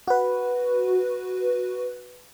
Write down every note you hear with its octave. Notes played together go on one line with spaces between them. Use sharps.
F#4 B4